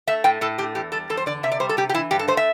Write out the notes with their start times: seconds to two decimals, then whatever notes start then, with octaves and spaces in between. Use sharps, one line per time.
0.07 A3 E5
0.24 A2 G5
0.41 A2 A4
0.58 A3 G4
0.75 E2 G4
0.92 G3 A4
1.10 E2 A4
1.17 C5
1.26 D3 D5
1.43 C3 E5
1.52 D5
1.60 G3 C5
1.69 A4
1.77 C3 G4
1.89 G4
1.94 E3 E4
2.11 G2 G4
2.19 A4
2.28 A3 C5
2.37 E5